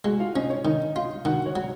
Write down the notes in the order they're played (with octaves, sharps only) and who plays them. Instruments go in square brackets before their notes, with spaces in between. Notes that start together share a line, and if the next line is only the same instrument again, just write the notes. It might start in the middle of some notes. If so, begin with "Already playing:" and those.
[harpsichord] G#3 [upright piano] F#4 F#5
[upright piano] F4 F5
[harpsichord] C#4 [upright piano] D#4 D#5
[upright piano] C#5
[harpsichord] D#3 [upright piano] D#4 D#5
[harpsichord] F4
[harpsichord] D#3 [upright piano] F#4 F#5
[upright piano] C#5
[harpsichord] F#3